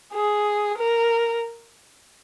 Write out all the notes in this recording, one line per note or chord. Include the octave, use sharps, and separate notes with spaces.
G#4
A#4